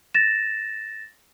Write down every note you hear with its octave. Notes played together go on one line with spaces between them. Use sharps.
A6 A#6 E7